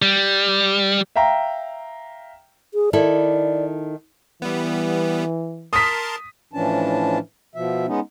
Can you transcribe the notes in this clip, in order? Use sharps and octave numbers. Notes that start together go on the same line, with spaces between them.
G3
E5 F5 G5 A#5
G#4
D#3 E4 A4 D5
E3 G3 B3
A#4 A5 C6 D#6 B6
A2 E3 F3 C#4 D4 A5
B2 F3 E5
G#3 B3 C#4 D#4